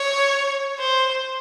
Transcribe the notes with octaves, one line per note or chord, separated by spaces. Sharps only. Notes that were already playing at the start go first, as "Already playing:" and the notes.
Already playing: C#5
C5